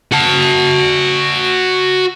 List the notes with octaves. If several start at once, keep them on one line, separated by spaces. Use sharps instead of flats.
F#4 A5